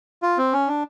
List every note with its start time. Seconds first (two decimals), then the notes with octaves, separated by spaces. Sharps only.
0.22 F4
0.38 C4
0.53 C#4
0.68 D4